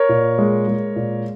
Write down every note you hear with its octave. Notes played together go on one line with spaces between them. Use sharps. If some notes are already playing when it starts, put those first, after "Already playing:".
Already playing: A#4 C#5
A#2
G#3
G#3
A#2